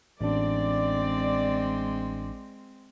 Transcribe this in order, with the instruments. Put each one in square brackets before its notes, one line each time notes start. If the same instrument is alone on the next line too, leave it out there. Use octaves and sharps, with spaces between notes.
[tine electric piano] A1 D4 [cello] G#3 C4 [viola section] D5